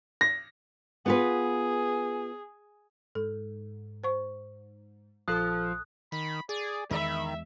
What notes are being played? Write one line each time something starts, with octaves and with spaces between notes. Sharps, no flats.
A#6
B3 F4 G#4 B4
G#2 A4
C5 C#6
A#1 F3 A4 D#6 F#6
D#3 B5
G#4 D5
E2 D#3 G#3 E5 B5